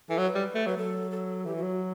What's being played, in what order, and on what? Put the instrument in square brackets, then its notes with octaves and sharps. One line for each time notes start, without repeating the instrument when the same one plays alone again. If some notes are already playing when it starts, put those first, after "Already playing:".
[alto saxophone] E3 [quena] A4
[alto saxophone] F#3
[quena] B4
[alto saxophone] G3
A3
[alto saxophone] F#3 [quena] B4
[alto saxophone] F#3 [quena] A4
[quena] A4
[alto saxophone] E3 [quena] G4
[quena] F#4
[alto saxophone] F#3
[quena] F#4